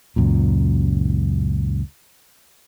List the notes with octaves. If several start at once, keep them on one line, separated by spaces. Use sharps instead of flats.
C#2 F#2 A#2